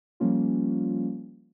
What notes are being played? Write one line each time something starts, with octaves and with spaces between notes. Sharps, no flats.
F3 G3 A#3 C#4 F4